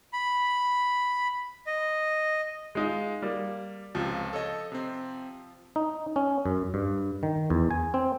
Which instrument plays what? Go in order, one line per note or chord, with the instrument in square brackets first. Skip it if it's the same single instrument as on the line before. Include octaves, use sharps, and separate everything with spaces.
[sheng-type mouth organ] B5
D#5
[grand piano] G#3 D#4 F4
G3 A#3
[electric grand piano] C#2 C3 [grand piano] F3
[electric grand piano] A4 C#5 D#5
C3 C4
[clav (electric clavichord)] D#4
C#4
F#2
G2
D#3
E2
G#5
C4